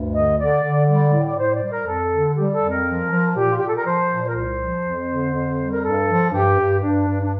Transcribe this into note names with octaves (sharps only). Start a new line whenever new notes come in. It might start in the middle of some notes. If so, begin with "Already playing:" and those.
Already playing: D2 G2
D3 D#5
D3 D5
D3
G3 D5
A2
D5
A2 C5
D5
G3
A#4
F2 A4
D3
G3 G4
A4
F2
A#4
F3
F3
A#2 G4
F4
A#2 G4
A4
A#4
F3 C5
A#2
A#4
C2 C5
F3
F2
D3
F2
G3
A#4
G2 A4
F3
G2 G4
G2
G2 D4
G2
D4